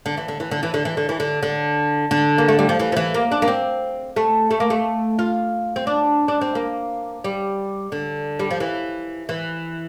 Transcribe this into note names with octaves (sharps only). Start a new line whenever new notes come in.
D3
E3
D3
E3
D3
E3
D3
E3
D3
E3
D3
D3
D3
A#3
A3
G3
F3
E3
F3
E3
A#3
D4
A#3
C4
A3
A3
A#3
A3
F4
C4
D4
D4
C4
A#3
G3
D3
G3
F3
E3
E3